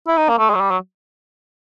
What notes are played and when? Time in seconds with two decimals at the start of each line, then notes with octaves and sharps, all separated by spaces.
0.08 E4
0.17 D#4
0.29 A#3
0.38 A3
0.50 G#3
0.55 F#3
0.60 G3
0.71 F#3